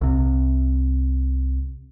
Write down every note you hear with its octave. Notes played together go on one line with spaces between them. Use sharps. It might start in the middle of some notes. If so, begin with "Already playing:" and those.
C2 C3